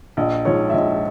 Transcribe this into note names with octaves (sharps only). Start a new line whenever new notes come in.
A#1 D#5
G#2 F3 G#3 C#5
E5
A#1 D#5